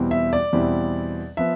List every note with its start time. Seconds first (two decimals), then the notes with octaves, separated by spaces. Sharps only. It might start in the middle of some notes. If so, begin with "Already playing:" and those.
Already playing: E2 B2 G3 C4 E4
0.11 E5
0.33 D5
0.53 E2 B2 G3 C4 E4
1.37 F3 B3 E5